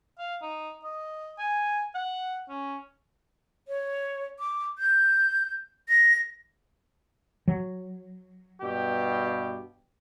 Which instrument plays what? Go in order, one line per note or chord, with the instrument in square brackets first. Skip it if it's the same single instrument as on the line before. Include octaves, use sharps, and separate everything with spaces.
[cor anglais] F5
D#4
D#5
G#5
F#5
C#4
[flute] C#5
D6
G6
A#6
[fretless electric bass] F#3
[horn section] G2 B2 G4